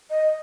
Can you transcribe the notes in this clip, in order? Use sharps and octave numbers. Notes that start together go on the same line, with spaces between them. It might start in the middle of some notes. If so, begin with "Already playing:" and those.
D#5